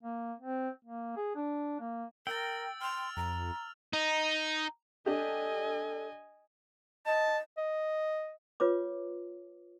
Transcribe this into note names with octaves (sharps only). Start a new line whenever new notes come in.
A#3
C4
A#3
G#4
D4
A#3
A#4 G5 E6 A6
C6 F6 F7
F2 A#5
D#4
D4 G4 A4 D#5 G#5
D#5 A5
D#5
F4 B4 C#5 D6